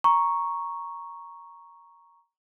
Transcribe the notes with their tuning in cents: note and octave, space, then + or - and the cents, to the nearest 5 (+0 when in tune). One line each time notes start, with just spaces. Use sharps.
A#5 +5 C#6 +0